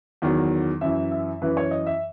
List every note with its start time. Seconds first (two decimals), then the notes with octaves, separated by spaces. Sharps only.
0.22 E2 D#3 F#3
0.81 F#2 E3 E5
1.11 E5
1.41 F#2 E3 B4
1.57 C#5
1.71 D#5
1.87 E5